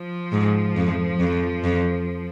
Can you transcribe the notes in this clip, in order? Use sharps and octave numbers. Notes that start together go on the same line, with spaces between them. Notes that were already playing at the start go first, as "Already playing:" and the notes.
Already playing: F3
G#2
F2
F2
F2